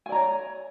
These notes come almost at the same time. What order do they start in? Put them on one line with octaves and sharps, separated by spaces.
G#5 D5 A#5 C#5